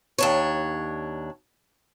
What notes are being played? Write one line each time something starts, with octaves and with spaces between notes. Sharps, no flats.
D#2 D4 C#5